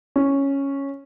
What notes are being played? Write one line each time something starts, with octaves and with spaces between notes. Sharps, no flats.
C#4